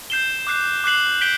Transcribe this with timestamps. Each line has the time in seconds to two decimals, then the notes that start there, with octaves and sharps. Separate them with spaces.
0.10 G6 C7 E7 G7
0.47 D6 F#6 C7
0.84 D6 F#6 C7 F#7
1.21 G6 B6 D7 G7